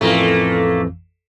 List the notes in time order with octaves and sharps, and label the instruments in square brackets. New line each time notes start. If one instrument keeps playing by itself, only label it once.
[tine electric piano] A1 F2 E3 [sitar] A3 A#3